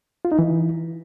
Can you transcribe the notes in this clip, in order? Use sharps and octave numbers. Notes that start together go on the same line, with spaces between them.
F4
D#4
E3